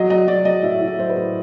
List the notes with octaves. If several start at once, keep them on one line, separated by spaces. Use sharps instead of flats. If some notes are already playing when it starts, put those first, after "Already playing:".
Already playing: F#3 D#5
F#3 D#5
F#3 D5
F#3 D#5
A2 E5
A2
E5
F#3 C5
B4
A2